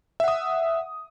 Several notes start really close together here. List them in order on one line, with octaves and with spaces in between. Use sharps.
E5 F#5 D#6